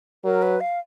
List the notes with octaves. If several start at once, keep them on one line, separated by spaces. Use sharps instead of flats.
F#3 A#4
B4
F5